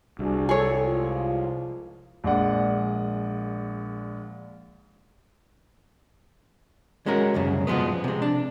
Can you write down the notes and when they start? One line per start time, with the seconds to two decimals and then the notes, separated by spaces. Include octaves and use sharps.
0.19 C2 D4 F#4 G#4
0.49 G#4 A4 C#5
0.82 F3 G#3 F4
2.24 A#1 G#3 D5 F#5
7.06 G#3 C#4 F#4 A#4
7.34 C2 F#2 C#3
7.67 B2 F3 F#3 G#3 B3
8.04 C3 G#3
8.22 D4